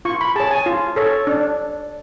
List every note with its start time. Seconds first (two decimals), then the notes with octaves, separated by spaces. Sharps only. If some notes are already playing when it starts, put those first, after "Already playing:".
0.05 F4 C#6
0.21 B5
0.36 G#4 C#5 A5
0.51 G#5
0.66 F4
0.96 A4 C#5
1.27 D4